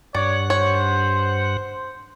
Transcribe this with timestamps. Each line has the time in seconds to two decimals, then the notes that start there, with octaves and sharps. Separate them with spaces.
0.15 G2 C#5 D5 F#5
0.50 C5 C#5